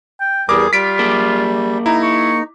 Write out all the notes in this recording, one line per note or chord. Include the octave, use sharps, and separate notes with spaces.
G5
E2 G3 G#4 A#4 D6
G3 F4 B6 D7
A#3 G#4 A#4
D#4 E4 A#5
C#6